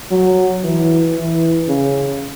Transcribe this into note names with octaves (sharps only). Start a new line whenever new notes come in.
F#3
E3
E3
C#3